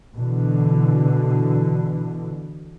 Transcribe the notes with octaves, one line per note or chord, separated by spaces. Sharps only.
B2 D3 E3